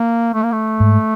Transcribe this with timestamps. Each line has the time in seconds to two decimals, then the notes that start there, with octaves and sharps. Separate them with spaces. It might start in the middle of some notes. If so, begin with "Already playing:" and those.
Already playing: A#3
0.34 A3
0.43 A#3
0.52 A3
0.80 G#2